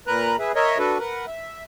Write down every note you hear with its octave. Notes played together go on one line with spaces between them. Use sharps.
A#2 A#4 B4 A#5 F#6
G#4 B4 E5
A#4 C#5 D#5 E5
D4 F#4 A4 B4
A#4 B4 F#5
E5